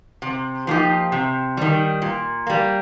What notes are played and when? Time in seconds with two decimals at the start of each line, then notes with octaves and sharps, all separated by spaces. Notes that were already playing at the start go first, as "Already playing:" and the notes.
0.22 C3
0.67 F3 A#3 D#4 G4
1.12 C3
1.57 D#3 G3
2.02 A#2
2.47 G3 A#3